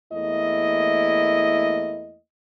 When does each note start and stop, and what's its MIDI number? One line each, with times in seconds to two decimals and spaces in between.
0.13 2.18 40
0.13 2.18 57
0.13 2.18 58
0.13 2.18 64
0.13 2.18 75